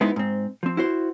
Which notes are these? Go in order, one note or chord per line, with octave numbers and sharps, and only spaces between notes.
G#3 B3 C4 D#4 E4
G#2 C4
F3 C4
E4 F#4 C5